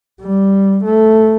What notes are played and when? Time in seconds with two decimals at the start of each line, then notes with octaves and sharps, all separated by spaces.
0.22 G3
0.84 A3